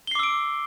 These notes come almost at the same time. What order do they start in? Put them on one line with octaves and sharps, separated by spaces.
G7 C7 D6 E6 D7